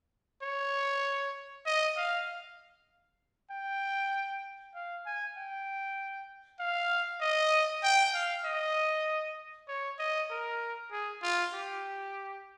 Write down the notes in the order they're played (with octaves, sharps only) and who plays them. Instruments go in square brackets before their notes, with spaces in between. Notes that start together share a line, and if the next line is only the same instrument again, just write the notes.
[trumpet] C#5
D#5
F5
G5
F5
G#5
G5
F5
D#5
G5
F5
D#5
C#5
D#5
A#4
G#4
F4
G4